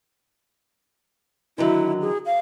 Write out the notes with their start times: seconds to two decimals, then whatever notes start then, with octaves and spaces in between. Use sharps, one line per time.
1.58 D3 D#3 F#3 E4
2.01 G#4
2.26 F5